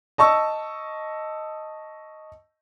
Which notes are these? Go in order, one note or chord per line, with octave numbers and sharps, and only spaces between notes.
D#5 A5 C#6 E6